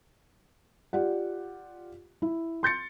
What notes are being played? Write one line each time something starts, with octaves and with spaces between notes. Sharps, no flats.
F4 G4 D5 F#5
E4
C6 G6 A6 C#7